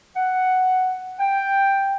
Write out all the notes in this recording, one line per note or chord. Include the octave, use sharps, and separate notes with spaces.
F#5
G5